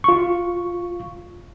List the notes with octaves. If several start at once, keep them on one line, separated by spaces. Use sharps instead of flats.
F4 C#6